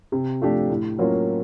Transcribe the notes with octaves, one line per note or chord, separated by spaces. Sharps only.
C3
F3 A3 D4 G4
A2
F#3 A#3 C#4 F4